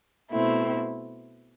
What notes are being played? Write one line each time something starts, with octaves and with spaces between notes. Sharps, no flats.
B2 A3 C4 E4